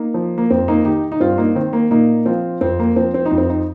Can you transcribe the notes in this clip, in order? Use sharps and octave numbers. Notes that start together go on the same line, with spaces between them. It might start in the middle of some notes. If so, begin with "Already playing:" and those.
Already playing: A#3 D#4
F3
A#3
F2 C4
A#3 D#4
D#3 D#4 G4
D#4
G2 C4 F4
A#3 D#4
D#3 C4
A#3
A#2 A#3 D#4
F3 C4 F4
F2 C4
A#3
F3 C4
C4
D#4
F2
C4
D#4